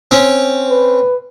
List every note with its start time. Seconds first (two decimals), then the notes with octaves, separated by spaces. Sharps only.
0.11 C4 C#4
0.69 B4